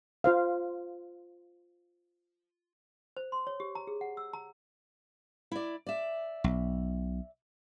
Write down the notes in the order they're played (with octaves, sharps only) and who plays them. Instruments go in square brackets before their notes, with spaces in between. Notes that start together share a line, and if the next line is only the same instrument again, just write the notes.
[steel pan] F4 C5 F5
[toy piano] C5
C6
C#5
G4
A#5
G#4
F#5
E6
A#5
[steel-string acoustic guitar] E4 D5
D5 E5
[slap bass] B1